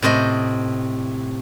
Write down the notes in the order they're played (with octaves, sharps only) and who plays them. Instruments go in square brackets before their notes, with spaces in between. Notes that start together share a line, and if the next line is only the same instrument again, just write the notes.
[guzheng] A2 C3 C5 D#5